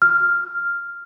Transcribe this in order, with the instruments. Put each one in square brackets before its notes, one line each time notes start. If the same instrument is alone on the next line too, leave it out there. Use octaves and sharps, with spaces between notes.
[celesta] F6